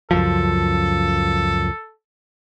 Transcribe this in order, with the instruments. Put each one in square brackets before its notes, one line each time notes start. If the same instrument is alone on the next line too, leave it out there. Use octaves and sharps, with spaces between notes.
[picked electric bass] C#2 F#2 F3 [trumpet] A4